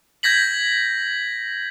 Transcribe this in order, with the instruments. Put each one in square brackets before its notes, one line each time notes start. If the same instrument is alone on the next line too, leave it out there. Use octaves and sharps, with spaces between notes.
[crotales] G6 G#6 A#6 B6 F#7